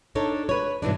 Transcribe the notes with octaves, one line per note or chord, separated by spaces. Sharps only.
D4 D#4 A4 C#5
B4 C#5
G2 B2 E3 D4